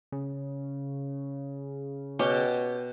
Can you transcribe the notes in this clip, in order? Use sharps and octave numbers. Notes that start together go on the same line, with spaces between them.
C#3
B2 C#4 G4 G5